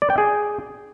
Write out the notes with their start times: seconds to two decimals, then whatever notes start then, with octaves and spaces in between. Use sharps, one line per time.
0.02 D5
0.10 G5
0.18 G#4